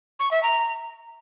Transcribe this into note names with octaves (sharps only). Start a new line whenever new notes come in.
C#6
E5
A#5